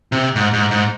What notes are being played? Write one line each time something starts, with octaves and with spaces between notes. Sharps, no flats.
C3
G#2
G#2
G#2